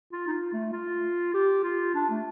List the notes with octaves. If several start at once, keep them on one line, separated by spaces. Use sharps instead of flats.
F4
D#4
F4
A3
F4
G4
F4
D4
A3